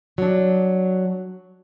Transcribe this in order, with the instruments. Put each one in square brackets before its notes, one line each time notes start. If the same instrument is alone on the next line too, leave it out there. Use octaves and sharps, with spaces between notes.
[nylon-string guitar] F#3 D4